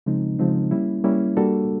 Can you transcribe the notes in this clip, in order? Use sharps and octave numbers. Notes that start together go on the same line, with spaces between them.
C#3 F3 G#3 C4 D#4
C#3 F3 G#3 C4 D#4
G3 A#3 C#4 E4
G3 A#3 C#4 E4
G3 A#3 D4 F#4 A4